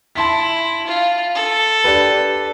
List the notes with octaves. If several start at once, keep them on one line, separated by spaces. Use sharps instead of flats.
E4 A5 C6 B6
F4
A4
D4 G4 B4